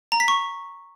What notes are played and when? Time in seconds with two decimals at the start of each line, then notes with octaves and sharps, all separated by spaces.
0.12 A#5
0.20 B6
0.28 C#6